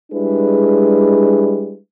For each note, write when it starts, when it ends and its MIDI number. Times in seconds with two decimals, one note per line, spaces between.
0.12 1.76 55
0.12 1.76 56
0.12 1.76 62
0.12 1.76 64
0.12 1.76 68
0.12 1.76 71